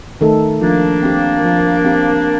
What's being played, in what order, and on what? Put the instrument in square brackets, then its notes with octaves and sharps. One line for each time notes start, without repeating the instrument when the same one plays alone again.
[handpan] D#3 A3 D#4 A4
[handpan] F3 [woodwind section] A#3 D4
[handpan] C4 G4
F3
C4 G4